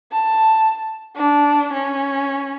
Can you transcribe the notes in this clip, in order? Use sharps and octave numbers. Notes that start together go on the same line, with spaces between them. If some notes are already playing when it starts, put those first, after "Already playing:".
A5
D4
C#4